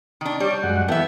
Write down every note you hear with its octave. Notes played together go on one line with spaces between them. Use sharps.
D#3 D4
G3 C#5 D5
F#2 G#3 F#5
E3 B3 A4 E5 G5